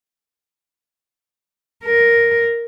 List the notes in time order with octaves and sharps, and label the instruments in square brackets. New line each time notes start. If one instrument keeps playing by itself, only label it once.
[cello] A#4